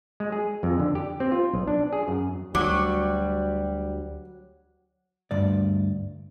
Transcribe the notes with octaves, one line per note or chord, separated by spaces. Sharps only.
G#3
G#4
F2
D3
G4
C4
F4
B1
D4
G#4
F#2
D2 F#3 G3 D6
D2 G2 D5